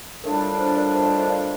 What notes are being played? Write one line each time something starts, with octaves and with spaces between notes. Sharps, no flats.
A2 G3 D4 F4 A#4
C5
A#4 D5
C5 D#5
A#4 D5
C5 D#5
D5 F5